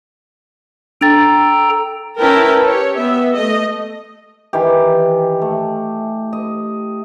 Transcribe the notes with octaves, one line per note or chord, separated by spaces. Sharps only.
D4 A4 G5 A#5 A6
C#4 E4 A#4 B4 G5 A5
G4 C#5
B3 E5
A3 D#5
D#3 E3 G4
A3
D#5